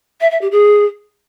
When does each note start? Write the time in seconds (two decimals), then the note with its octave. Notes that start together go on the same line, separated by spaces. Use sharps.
0.21 E5
0.31 E5
0.41 G4
0.52 G#4